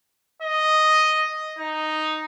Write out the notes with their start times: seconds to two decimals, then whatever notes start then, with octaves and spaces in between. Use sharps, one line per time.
0.42 D#5
1.59 D#4